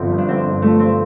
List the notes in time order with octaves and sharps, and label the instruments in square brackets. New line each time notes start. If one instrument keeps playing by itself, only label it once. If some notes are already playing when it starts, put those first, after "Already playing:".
Already playing: [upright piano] G1 D3 F3 [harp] C4
[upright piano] G2
[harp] D4
[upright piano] D3 [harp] C4
[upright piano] G1
[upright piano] F3 [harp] A3
[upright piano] G2 [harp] C4